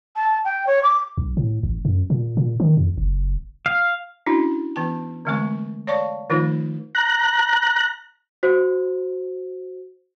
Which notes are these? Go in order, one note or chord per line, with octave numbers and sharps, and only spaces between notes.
A5
G5
C#5
D6
B1
A2
A1
F#2
A#2
A#2
D#3
F2
F#1
F5
C#4 D4 E4 F#4
E3 B3 A5
D3 E3 G#3 A3 C4 C#6
C#5 D5 F5 A5 C#6
D#3 F3 A3 D#4 F4
A#5 F#6
F#4 C5